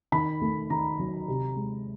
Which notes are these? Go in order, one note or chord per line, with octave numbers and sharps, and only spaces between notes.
D#3 B5
A3
D#3 A#5
F#3
C3
G#3